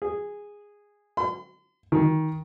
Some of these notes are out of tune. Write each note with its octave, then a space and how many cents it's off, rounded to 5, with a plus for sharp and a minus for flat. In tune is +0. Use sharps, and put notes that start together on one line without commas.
G#4 -10
C6 -45
D#3 +20